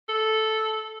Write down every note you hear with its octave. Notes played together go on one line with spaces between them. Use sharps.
A4